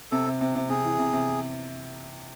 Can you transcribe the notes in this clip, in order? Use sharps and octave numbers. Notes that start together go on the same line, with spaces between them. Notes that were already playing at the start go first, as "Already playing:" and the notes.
C3 A4
C3
C3
C3
C3 G#4
E3
C3
C3